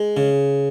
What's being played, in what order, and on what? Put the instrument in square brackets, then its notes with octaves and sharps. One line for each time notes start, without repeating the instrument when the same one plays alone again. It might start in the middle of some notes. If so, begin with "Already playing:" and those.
Already playing: [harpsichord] G#3
C#3